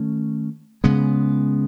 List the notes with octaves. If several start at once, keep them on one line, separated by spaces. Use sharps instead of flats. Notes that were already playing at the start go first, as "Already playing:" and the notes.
Already playing: D#3 A3 C#4
C#3 G#3 B3